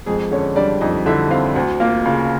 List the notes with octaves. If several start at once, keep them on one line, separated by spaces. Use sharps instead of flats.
F2 G#3 G#4
D3 C#4 C#5
G3 D4 D5
F2 D#4 D#5
D3 E4 E5
C4 F4 F5
D2 F#4 F#5
A#3 F4 F5
C#3 F4 F5